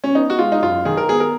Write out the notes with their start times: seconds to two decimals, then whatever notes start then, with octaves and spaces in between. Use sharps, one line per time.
0.04 C#4
0.15 B3 D#4
0.30 F#4
0.39 G#3 F4
0.52 D#4
0.62 F#2 F4
0.85 D#3 G#4
0.97 A#4
1.09 B3 G#4
1.20 A#4